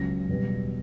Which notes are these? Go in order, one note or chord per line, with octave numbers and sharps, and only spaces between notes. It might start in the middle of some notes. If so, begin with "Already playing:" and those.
Already playing: C#2 C#3 F#3 A#6
E2 B2 G3